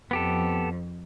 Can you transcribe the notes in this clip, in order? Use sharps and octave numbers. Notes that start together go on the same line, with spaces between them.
F2 B3 G4 A4